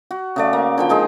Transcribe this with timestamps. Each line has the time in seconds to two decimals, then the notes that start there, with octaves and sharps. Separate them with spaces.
0.11 F#4
0.36 C#3 A3 D5
0.53 A#3
0.78 D3 F3 G5
0.89 D#3 G#3 G#4 D#5